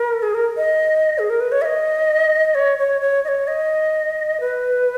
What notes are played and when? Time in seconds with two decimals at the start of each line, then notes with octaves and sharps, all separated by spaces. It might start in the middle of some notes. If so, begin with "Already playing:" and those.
Already playing: A#4
0.22 G#4
0.34 A#4
0.57 D#5
1.19 G#4
1.30 A#4
1.41 B4
1.52 C#5
1.62 E5
1.65 D#5
2.55 C#5
2.78 C#5
3.01 C#5
3.25 D#5
3.28 C#5
3.47 D#5
4.40 B4